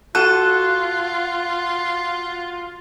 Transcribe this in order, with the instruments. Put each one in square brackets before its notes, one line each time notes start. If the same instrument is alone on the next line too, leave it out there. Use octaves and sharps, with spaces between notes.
[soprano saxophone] F4 [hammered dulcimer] F#4 [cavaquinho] A4 [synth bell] F#6